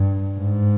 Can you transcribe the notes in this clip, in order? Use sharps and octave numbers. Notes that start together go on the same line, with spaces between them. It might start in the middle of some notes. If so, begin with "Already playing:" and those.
Already playing: G2
G#2